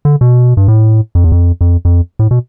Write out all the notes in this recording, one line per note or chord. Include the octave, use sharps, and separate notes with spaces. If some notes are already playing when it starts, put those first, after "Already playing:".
D3
B2
G2
A2
F2
E2
F2
F2
F2
A2
B2